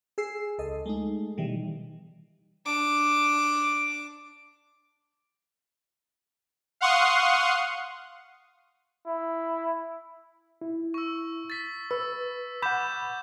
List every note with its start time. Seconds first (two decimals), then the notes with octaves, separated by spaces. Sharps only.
0.18 G#4 E6 C7
0.58 C#2 A4 D#5
0.86 G#3 A3 D#4
1.37 B2 D#3 E3 G3
2.66 D4 D6
6.81 F5 F#5 C6 C#6 D#6
9.07 E4
10.61 E4
10.94 C#6 E6
11.50 A6 B6
11.91 B4 E6
12.62 F#5 B5 D6 G6 E7